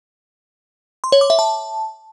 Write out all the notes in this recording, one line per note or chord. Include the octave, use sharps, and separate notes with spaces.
C6
C#5
D6
E5
A5